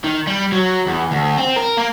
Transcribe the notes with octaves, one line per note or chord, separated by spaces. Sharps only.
D#3
G3
F#3
E2
D2
C4
A#4
A#3